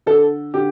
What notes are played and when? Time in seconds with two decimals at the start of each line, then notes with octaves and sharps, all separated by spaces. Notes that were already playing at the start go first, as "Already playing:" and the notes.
0.06 D3 A4
0.54 D3 G4